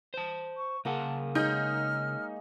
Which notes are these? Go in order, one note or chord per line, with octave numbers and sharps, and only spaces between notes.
C5 A5
C#6
C#3 A#3 G#4 A#4 F#5 A5
G#3 D#4 C#5 C6 F6 G6